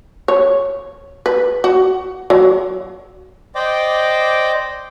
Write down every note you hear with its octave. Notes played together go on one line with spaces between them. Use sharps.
C#5
B4
F#4
F#3
C5 D5 D#5 G5 D6